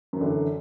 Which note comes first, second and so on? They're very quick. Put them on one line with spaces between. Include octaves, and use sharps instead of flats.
F#2 E3 D3